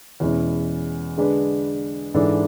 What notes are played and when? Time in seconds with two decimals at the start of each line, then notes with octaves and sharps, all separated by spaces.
0.20 E2 B2 G#3 C#4 E4
1.17 D3 G#3 D4 G#4 B4
2.14 G#2 E3 G#3 D4 A4